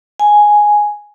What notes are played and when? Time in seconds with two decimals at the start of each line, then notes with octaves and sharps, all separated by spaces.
0.20 G#5